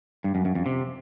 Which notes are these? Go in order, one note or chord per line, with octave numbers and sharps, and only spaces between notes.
G2
F#2
F#2
F2
C3